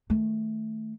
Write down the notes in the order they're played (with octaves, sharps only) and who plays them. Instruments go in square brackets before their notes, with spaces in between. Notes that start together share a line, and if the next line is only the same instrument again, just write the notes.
[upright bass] D#3 A3